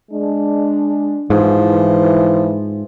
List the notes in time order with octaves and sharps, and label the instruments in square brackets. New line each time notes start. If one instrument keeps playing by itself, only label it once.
[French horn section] G#3 D4
[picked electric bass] G#2 [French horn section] E3 [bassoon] F3